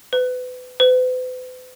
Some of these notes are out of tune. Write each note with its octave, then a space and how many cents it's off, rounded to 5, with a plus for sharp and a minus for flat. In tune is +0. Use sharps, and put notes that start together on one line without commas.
B4 +30
B4 +45